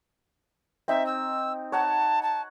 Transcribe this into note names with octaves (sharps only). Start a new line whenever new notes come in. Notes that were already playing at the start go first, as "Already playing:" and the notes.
C4 D#4 E5
E6
C#5 F#5 A5 A#5
A5